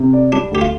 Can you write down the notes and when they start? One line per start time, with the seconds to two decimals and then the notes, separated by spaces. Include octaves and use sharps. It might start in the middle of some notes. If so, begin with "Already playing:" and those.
Already playing: C3
0.13 D5
0.32 G3 D4
0.51 D2 G4
0.61 F4